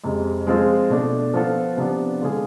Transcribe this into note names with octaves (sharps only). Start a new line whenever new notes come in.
F2 C3 G#3
F3 G#3 C4 F4 G#4
B2 A3 D4
F3 B3 F4 A4
C3 F3 B3 D4
D3 G#3 D4 F4 G#4